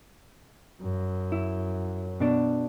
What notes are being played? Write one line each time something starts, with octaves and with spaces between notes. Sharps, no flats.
F#2
E4
B2 D4